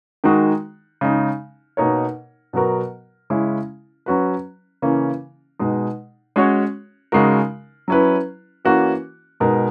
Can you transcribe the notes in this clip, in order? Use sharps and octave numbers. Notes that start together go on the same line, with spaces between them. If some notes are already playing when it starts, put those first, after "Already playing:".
D#3 G#3 D#4 F#4
C#3 G#3 D#4
B2 A#3 D#4 A#4 C#5
B2 F#3 B3 F#4 A#4
C#3 G#3 C#4 E4
F#3 C#4 F#4 B4
C#3 E3 A#3 C#4
B2 G#3 D#4
G#3 C#4 F#4 C#5
C#3 G#3 D#4 F#4 A#4
F#3 C#4 E4 B4
E3 A#3 C#4 F#4
B2 G#3 D#4 A#4